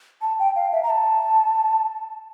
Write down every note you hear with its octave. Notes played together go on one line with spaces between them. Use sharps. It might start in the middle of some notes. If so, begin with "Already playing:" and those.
A5
G5
F5
E5
A#5
A5